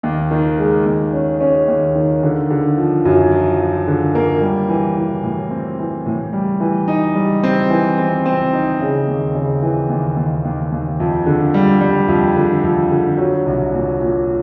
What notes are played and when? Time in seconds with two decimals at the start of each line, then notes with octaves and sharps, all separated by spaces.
0.03 D#2
0.31 D#3
0.58 G#3
0.86 D#2
1.13 C#4
1.41 C#4
1.68 D#2
1.95 D#3
2.23 D3
2.50 D3
2.77 F3
3.05 F#2
3.32 F3
3.59 F3
3.87 D3
4.15 A#3
4.41 G3
4.69 E3
4.97 E3
5.24 A2
5.51 C4
5.79 E3
6.06 A2
6.33 G3
6.60 E3
6.88 D#4
7.15 G3
7.43 C4
7.70 E3
7.98 C4
8.26 C4
8.53 D#4
8.80 C#3
9.08 D#2
9.35 C#3
9.62 E3
9.89 D#2
10.17 D#2
10.45 D#2
10.72 D#2
11.00 F2
11.26 D3
11.54 G3
11.81 G3
12.08 F2
12.36 D3
12.64 F2
12.91 D3
13.18 F#3
13.46 C2
13.74 A#2
14.01 A#2